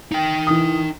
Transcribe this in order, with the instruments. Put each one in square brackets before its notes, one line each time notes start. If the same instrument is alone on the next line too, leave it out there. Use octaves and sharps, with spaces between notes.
[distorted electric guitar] D#4 G5
[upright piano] E3 D#6